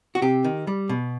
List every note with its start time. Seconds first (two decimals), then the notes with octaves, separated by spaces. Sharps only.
0.15 F#4
0.22 C3 G4
0.44 D#3
0.67 G3
0.89 B2